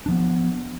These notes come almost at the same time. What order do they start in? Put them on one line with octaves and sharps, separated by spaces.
D4 F3 B3